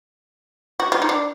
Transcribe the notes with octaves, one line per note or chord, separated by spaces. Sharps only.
F#4
F4
D#4
D4